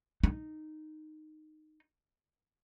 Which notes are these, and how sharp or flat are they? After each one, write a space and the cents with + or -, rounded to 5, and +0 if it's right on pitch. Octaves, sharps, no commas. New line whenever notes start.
D#4 -10